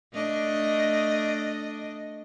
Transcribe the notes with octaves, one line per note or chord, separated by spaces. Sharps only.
A3 D4 D#5